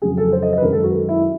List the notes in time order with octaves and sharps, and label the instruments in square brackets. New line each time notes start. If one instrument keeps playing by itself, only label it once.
[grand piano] F2 C#3 F#3 G#4
A4
C5
D#5
D#5
B4
F#2 D#3 G#3 A#4
A4
F#4
E4